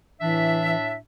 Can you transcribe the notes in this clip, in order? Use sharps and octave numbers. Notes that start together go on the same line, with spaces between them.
A2 E3 D4 E5